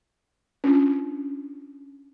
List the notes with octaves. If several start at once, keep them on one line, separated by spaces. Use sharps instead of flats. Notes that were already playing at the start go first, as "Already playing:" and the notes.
C#4 D4 F4